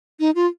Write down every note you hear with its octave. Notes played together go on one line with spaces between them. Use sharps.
D#4
F4